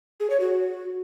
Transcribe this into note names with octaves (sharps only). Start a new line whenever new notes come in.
G#4
C#5
F#4